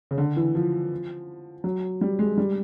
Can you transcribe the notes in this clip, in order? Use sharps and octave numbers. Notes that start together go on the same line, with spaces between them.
C#3
D3
E3
F3
F#3
G3
G#3
G3